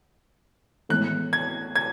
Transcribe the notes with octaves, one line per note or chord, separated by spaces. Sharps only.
A2 E3 G#3 B3 F#6
G#6
G#6